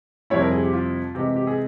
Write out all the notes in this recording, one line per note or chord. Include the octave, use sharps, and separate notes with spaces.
F2 C3 G3 C4 E4 C#5
A#4
G#4
G4
F4
C3 E3 G#3 G4
G4
G#4